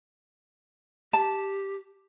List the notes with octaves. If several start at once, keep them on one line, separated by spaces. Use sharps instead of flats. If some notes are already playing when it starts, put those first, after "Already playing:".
G4 A5